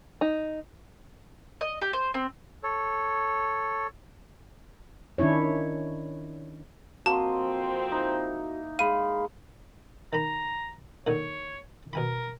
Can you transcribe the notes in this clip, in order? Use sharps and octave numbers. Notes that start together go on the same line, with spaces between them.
D#4
D#5
G4
C5
C4
A4 C#5
D#3 C#4 D4 E4 C#5
F2 F3 A#3 C4 F#4 D#5 A5 C6
D#4 E4
G#3 F5 B5 D#7
D#3 A#5 B5
A#2 D3 D#3 C#5
B2 A#4 G#5 B5